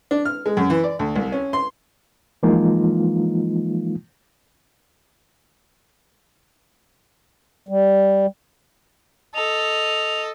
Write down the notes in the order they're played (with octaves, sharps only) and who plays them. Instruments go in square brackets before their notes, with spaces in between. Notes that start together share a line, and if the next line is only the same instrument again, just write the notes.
[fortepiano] D4
F6
G#3
F#2
E3
D5
D2
C2
C#4
C6
[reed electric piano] E3 F3 G#3 A#3 D#4 F4
[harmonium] G3
[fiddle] A4 D#5 [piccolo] F7